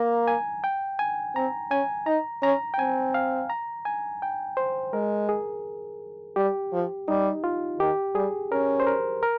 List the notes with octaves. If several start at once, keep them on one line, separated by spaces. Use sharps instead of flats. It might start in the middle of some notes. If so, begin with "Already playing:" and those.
Already playing: A#3 A#5
G#5
G5
G#5
C4 A#5
C#4 G#5
D#4 A#5
C#4 A#5
G5
C4 G#5
F5
A#5
G#5
G5
C5
G#3 A#4
G#4
G3 G4
F3
G3 D#4
F4
D#3 G4
G3 G#4
C#4 A#4
C5
A#4
A#4